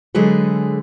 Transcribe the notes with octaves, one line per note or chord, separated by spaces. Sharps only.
D3 F#3 G#3 G#4 A4 B4